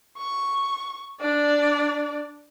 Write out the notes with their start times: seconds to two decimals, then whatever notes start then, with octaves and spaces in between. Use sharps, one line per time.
0.17 C#6
1.21 D4 D5